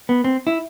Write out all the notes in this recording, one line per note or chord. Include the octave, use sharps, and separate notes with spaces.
B3
C4
E4